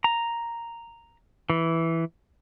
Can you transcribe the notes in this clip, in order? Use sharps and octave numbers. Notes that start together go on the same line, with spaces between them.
A#5
E3